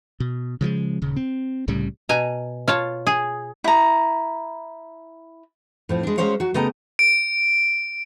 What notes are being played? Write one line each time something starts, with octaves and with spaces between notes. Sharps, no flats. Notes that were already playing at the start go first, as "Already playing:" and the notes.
B2
C#3 F3 F#3 G#3
D#1 C#3
C4
C2 A2 C#3 G3
B2 G#5 A#5
F4 C#5 A5
G#4
E4 A#5
A2 F3 C4
G#3 D4
F#3 G#3 C#4 C5 C#5 F5
F#3 F#4
C#3 A3 B3 D#5 G5 A#5
D7